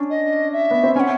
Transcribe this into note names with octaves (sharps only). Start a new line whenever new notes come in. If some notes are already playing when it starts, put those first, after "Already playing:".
Already playing: C#4 D4
D#5
E5
B3
C4
C#4 F#5 G#5